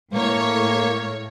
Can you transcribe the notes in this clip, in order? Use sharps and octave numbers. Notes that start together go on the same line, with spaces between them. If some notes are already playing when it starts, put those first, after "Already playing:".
A2 A#3 C#5